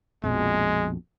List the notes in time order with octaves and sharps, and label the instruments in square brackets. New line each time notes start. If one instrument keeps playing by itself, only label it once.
[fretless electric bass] A#1 F2 B2 [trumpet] G#3